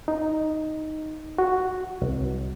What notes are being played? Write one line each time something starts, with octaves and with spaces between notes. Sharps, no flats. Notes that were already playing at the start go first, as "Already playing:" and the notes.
D#4
F#4
C2